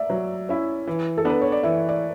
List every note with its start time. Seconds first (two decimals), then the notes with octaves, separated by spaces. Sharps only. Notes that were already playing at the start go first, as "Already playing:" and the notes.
Already playing: D5 E5
0.10 F#3
0.49 C#4 E4
0.87 E3
1.18 A4
1.25 B3 D4 B4
1.41 C#5
1.52 D5
1.63 E3 E5
1.89 D5